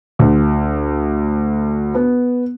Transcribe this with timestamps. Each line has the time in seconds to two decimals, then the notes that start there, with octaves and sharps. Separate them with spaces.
0.19 D2
1.95 B3